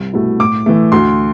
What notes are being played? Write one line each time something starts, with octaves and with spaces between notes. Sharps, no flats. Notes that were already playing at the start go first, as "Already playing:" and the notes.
Already playing: C2
B2 A3 E4
A2 D6
E3 A3
D2 C6